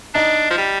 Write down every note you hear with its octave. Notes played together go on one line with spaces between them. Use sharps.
D4 D#4
F3
G3